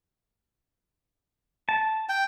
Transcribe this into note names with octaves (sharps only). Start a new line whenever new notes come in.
A5
G5